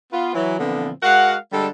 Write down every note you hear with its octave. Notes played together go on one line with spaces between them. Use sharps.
B3 F4
E3 F#3
A#2 D3 E3 F3 B3 C4
G#3 F#4 A#4 F5 F#5
D3 G3 G#3 A4